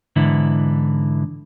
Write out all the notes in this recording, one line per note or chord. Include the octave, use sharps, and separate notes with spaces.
G#2 D3 E3 E4